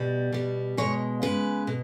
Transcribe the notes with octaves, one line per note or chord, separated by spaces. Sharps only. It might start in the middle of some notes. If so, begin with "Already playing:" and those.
Already playing: B2 G3
B2 G3
B2 G#3 C#5
C#3 G#3 B4
B2